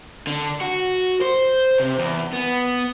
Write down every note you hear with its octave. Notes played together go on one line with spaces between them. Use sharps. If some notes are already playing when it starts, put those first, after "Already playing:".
D3
F#4
C5
C3
E2
B3